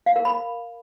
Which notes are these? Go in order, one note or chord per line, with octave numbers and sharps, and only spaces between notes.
F5
A#4
B5